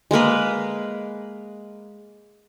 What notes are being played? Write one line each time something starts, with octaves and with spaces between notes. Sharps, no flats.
G#3 A#3 A#4 B4